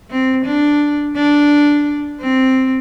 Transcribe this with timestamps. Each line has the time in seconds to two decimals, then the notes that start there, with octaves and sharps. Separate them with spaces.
0.10 C4
0.46 D4
1.16 D4
2.20 C4